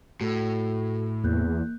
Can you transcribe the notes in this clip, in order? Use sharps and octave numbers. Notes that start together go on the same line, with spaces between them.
A2 F#4 A4
E2 A#3 F#6 G6